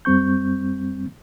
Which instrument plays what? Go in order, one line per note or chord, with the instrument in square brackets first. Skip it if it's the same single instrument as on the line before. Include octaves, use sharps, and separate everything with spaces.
[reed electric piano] F#2 G3 C4 C#6 G6